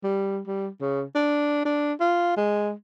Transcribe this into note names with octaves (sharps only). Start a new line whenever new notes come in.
G3
G3
C#3
D4
D4
F4
G#3